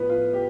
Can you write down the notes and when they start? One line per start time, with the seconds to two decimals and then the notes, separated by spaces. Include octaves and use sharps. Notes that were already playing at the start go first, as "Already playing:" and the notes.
Already playing: A2 F3 B3 B4
0.10 F4
0.33 G4